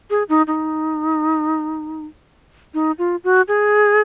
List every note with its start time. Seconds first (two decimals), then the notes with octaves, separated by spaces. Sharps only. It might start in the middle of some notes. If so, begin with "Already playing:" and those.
0.10 G#4
0.29 D#4
0.47 D#4
2.74 D#4
2.99 F4
3.24 F#4
3.48 G#4